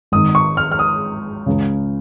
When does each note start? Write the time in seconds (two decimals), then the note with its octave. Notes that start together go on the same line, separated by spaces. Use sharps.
0.12 G#1 G#2 D#3 D#6
0.35 C#6
0.57 F6
0.72 F6
0.79 D#6
1.46 C#2 C#3